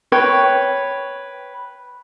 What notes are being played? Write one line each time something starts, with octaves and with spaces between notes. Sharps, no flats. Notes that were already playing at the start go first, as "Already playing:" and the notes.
B4 C#5 G5